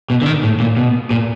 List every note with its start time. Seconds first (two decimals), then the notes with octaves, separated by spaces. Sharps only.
0.10 B2
0.22 D3
0.26 D#3
0.43 A2
0.60 A#2
0.77 B2
1.11 A#2